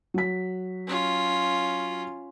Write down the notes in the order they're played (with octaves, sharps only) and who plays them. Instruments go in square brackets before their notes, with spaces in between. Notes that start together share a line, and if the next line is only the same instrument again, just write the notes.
[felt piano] F#3 B6
[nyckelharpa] C#4 F4